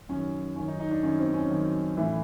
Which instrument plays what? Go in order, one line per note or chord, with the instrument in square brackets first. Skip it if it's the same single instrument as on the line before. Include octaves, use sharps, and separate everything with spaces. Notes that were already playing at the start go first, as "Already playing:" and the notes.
[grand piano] F#2 D#3 C#4
F#2 D#3 C#4
D#4
D#4
D4
F#2 D#3 C#4
C4
C#4
F#2 D#3
A2 E3